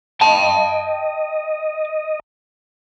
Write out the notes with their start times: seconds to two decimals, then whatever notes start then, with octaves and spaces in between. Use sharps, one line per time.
0.21 D#5 G5 A5